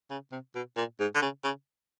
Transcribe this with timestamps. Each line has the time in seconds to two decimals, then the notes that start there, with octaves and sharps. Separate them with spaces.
0.10 C#3
0.32 C3
0.55 B2
0.77 A#2
1.00 G#2
1.15 D3
1.22 C#3
1.44 C#3